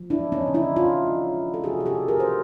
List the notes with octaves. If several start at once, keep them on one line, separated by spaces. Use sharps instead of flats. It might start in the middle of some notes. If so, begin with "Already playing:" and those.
Already playing: F3
D4 E4
G#3
C#4 D#4
C#3
D4 E4
G#3 D#4 F4
G#3
C#3
A4
C3 F#4 G#4
G#4
G4 A4
C3
G#4 A#4
G3 C5